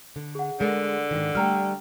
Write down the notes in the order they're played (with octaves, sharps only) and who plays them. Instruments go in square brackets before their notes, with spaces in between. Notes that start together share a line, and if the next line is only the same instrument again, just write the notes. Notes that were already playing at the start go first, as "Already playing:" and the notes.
[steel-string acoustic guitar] D3
[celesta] G#4 F#5
[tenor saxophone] D3 [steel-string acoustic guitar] G#3 A#4
[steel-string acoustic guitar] G#2 D#3
[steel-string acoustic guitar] G3 A3 [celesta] G5 A#5 F6